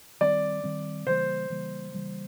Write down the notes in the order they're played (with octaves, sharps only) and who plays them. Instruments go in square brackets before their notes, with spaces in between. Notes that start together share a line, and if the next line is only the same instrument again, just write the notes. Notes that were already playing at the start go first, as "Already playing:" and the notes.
[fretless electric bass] D#3 G3 C4 [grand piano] D5
[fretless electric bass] D#3 G3 C4
[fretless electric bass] C#3 E3 G3 A#3 [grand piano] C5
[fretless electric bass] C#3 E3 G3 A#3
C#3 E3 G3 A#3